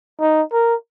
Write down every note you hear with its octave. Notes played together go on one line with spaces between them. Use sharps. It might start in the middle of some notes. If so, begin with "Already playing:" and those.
D#4
A#4